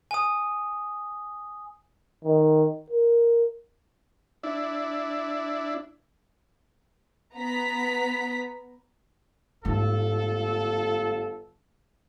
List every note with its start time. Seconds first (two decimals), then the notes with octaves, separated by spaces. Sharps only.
0.11 G#5 D#6
2.24 D#3
2.90 A#4
4.43 D4 E4
7.34 B3 A#5 B6
9.65 G1 G#2 A3 F4 A4